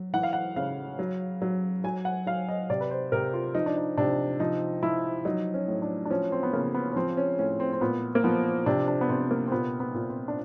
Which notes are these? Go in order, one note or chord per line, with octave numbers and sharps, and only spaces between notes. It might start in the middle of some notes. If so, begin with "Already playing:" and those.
Already playing: F#3
E3 F#5
F5
F#5
C#3 F5
F#3
F#3
F#3 G#5
F#5
F#3 F5
D#5
C3 D5
B4
C5
C3 A#4
F4
F3 D#4
D4
D#4
C3 D4
F3 D#4
F3 E4
F#3 D#4
C#4
A2
D4
D4
F3 C#4
C4
B3
C#3 A#3
B3
C#4
F3 C4
C#4
A2 C#4
C4
C4
A#2 B3
A#3
F3 B3
C3 D4
D4
B3
C3 C4
A#3
C4
A#2 B3
B3
A#2
C4
D4